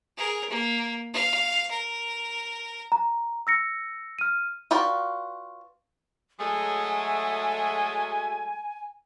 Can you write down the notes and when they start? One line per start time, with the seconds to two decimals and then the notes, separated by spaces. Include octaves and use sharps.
0.17 G#4 A#4
0.50 A#3
1.14 F5
1.71 A#4
2.92 A#5
3.47 E6 A#6 C#7
4.19 F6 D#7
4.71 F4 F#4 B4 D5 G5
6.39 F#3 G#3 A3 G#5